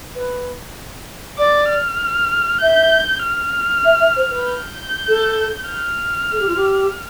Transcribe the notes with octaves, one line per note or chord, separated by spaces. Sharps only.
B4
D5 D6
F6
E5 G6
F6
E5
E5
C5
B4
G6
A4
F6
A4
G4
F4
G4